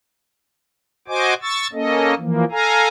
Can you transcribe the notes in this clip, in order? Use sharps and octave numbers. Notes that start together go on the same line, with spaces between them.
F#4 C5 D#5 G#5 D6
C#6 E6 A6
A#3 C#4 A4 D#5
E3 F3 A#3
A4 F5 G#5 A#5